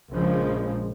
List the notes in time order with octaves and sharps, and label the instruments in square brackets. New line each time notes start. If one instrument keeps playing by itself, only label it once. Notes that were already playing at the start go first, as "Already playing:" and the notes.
[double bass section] A#1 C#3 F3 G#3